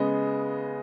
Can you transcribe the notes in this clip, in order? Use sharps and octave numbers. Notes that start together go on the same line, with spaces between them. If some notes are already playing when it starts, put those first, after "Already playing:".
Already playing: C#3 G#3 B3 D#5